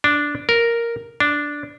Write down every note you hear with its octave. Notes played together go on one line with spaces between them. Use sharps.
D4
A#4
D4